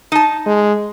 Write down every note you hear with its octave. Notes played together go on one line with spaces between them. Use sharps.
D#4 A5
G#3